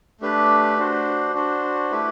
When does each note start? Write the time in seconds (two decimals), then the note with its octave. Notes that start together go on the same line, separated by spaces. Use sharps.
0.21 A3 D4 G4 B4
0.78 D4 F#4 C5
1.34 D4 F#4 C5
1.91 A3 E4 G4 B4